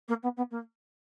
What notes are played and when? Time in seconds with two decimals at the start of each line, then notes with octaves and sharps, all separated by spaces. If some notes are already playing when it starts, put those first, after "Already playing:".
0.08 A#3
0.23 B3
0.37 B3
0.51 A#3